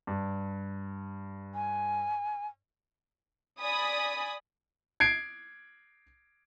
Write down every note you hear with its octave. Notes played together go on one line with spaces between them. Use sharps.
G2
G#5
D5 G#5 B5 D#6
G#6 C7 D7